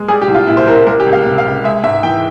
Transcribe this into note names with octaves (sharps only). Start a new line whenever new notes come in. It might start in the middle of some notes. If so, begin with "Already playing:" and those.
Already playing: G#3
G3 G#4
G4
C2
F4
A#2 E4
C5
C2 A#4
G3 A#4
G4
C#2
F5
C3
F5
C#2
G#3 E5
G#2 E5
E3 G5